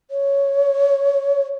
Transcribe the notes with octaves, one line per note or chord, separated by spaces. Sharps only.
C#5